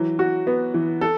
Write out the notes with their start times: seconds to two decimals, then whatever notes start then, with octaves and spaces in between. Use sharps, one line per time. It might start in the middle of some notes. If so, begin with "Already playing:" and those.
Already playing: E3 F#3
0.19 F#4
0.47 B3
0.74 E3
1.01 A4